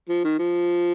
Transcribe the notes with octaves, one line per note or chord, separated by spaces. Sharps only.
F3
D#3
F3